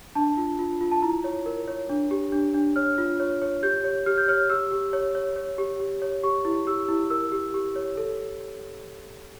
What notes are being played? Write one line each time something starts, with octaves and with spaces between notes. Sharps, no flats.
D4 A5
F4
F4
F4
A5
E4 A#5
C#5
A#4
C#5
D4
G4
D4
D4
C#5 F6
F4
C#5
C#5
G4 G6
C#5
G4 F6
G6
C#5 F6
G4 E6
G4
C#5
C#5
C#5
G4
G4
C#5
G4 C#6
E4
G4 E6
E4
A#4 E6
G4
G4
C#5
A4